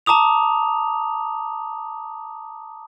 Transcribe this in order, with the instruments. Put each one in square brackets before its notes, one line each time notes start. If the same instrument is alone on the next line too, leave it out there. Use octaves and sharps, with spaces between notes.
[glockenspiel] A5 A#5 D6 D#6 F7